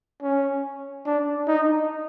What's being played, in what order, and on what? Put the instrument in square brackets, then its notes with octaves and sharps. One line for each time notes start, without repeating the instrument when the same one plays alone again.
[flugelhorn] C#4
D4
D#4